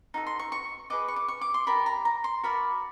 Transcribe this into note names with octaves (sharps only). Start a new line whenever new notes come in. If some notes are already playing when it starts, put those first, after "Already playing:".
D#4 F#4 A4
C6
C#6
C#6
G#4 B4 D#5 D6
C#6
D6
C#6
D6
C6
G4 A#4 D5 B5
A#5
A#5
C6
F#4 A#4 D5 B5